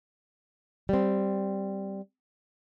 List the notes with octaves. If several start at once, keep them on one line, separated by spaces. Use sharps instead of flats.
G3 C4